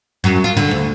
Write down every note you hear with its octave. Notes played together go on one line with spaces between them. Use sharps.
F#2
F4
D3
D2